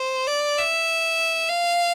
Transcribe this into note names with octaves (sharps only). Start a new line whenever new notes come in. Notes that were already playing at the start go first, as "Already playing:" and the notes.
Already playing: C5
D5
E5
F5